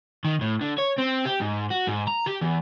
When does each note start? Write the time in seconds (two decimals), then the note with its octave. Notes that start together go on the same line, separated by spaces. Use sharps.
0.25 D#3
0.41 A2
0.61 D3
0.79 C#5
0.98 C4
1.26 G4
1.41 G#2
1.71 F#4
1.88 G#2
2.08 A#5
2.27 G4
2.42 E2